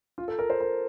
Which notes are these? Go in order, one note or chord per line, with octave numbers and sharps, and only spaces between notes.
F4
A4
A#4
C5
A#4